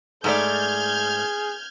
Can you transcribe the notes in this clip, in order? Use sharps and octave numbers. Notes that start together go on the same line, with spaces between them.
G#2 A3 G#4 D5 F6 G6 G#6